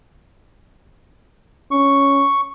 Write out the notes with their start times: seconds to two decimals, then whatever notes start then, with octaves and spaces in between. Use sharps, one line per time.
1.71 C#4 C#6